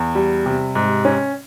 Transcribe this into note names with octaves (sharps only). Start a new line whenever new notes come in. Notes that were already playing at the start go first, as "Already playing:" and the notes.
Already playing: E2
G3
C3
G#2
C#4